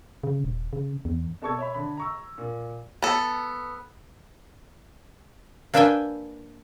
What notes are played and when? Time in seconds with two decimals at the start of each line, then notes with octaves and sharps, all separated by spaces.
0.24 C#3
0.44 D#1
0.73 C#3
1.05 E2
1.42 B2 A4 D5 C#6 E6 G#6
1.59 C#5 E5 B5
1.74 D3 B5
1.97 A#5 C#6 E6
2.38 A#2
3.02 B3 A4
5.74 A#3 D4 B4 E5 G5 G#5